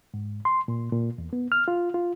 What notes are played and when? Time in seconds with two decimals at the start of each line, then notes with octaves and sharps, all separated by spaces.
0.14 G#2
0.45 C6
0.68 A#2
0.93 A#2
1.18 E2
1.33 B3
1.52 F6
1.68 F4
1.94 F4